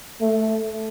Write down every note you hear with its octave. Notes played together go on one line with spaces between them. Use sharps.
A3